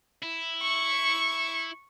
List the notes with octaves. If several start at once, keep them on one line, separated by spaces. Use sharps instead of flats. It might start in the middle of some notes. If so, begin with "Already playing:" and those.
E4
C#6